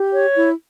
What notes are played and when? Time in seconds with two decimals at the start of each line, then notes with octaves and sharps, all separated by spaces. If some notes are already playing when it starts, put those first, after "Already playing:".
Already playing: G4
0.13 C#5
0.35 E4